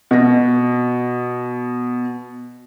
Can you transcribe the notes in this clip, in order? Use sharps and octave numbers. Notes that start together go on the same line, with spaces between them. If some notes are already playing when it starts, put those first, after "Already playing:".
B2 A#6